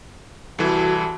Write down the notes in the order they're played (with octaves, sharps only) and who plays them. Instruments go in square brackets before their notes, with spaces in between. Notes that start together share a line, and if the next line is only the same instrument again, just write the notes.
[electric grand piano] C2 E3 [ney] F#4 [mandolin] A4